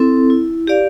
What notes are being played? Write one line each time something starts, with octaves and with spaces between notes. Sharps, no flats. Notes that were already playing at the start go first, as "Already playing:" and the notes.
Already playing: C4 E4 A4
E4
G4 D5 F5